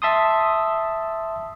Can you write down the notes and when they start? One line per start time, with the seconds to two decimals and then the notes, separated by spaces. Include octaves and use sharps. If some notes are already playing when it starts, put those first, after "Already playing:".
0.02 E5 A5 C6 D#6